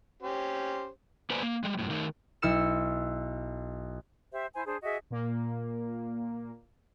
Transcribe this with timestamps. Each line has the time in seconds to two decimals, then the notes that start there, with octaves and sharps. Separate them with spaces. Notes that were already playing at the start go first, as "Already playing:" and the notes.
0.23 C#4 G4 C5
1.30 A#3 B4 C5 D5 G#5 A#5
1.43 A#3
1.64 G3 G#3
1.79 F#2 A2
1.90 D#3 A3 D#4 A#4
2.42 B1 E4 E6 F6 C#7 E7
4.32 G4 C5 E5
4.55 E4 C5 G#5
4.66 D4 G#4 C5
4.82 F#4 G#4 D#5 E5
5.10 A#2 A#3